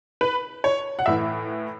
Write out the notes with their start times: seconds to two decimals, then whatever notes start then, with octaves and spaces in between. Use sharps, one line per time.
0.21 B4
0.64 C#5
0.99 F#5
1.06 A2 E3 E5